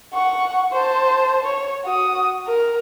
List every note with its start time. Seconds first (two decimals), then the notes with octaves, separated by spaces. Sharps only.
0.13 F#5 C#6
0.72 C5 A5
1.44 C#5
1.85 F#4 D#6
2.47 A#4